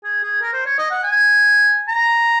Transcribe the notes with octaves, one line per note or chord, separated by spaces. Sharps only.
G#4
G#4
A#4
C5
C#5
D#5
F#5
G#5
A#5